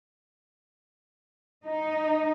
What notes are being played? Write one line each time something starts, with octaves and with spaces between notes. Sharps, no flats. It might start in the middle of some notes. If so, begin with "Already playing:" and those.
D#4